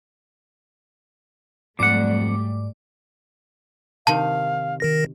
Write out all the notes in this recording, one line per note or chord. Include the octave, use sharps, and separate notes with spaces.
F2 G#2 F#3 G3 A3 D5 F#5 D6
C3 D#3 F5 A5
D#3 A#4 A#6